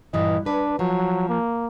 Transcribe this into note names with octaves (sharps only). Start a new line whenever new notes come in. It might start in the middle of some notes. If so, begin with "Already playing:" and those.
G2 A#2 E3 D#5
D4 B4
F3 F#3
A#3